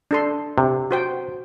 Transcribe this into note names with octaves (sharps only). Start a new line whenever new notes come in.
D4 A4 C6
C3
F#4 C5 G5